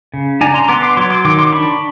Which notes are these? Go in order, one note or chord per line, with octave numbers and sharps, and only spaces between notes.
C#3
D4 G#5 A#5
A#5 C6
B3 C6 D6
C6 D6
F#3 C6 D6
C6 D6
D#3 C6 D6
C6 D6
D4 B5 C#6